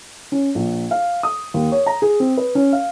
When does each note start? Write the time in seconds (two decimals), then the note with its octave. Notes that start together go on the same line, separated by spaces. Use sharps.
0.32 C#4
0.55 A#1
0.91 F5
1.23 D#6
1.54 D#2
1.72 C#5
1.86 A#5
2.02 G#4
2.20 C4
2.37 B4
2.55 C#4
2.73 F5